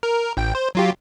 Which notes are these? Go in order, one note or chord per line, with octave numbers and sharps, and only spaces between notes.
A#4
A1 G5
C5
F#3 F4 G4